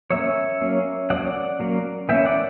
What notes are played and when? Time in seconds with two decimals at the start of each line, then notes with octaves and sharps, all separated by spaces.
0.10 F#3 A#3 C#4 C#5 E5
0.61 F#3 A#3 C#4
1.10 F#3 A#3 C#4 D5 F#5
1.60 F#3 A#3 C#4
2.09 E3 A#3 C#4 E5 G5
2.25 D5 F#5